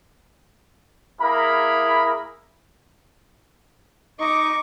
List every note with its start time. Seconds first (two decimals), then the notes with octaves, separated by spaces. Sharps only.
1.20 A#3 E4 G#4 A#4 B5
4.19 D#4 D#5 C#6 D6